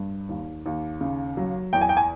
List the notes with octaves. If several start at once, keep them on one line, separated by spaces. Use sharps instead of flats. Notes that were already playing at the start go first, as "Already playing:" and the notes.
Already playing: G2
D#2
D#2
C#3
F#3
E2 G5
G#5
G5
G#5